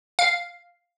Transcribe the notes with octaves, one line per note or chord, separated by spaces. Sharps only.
F5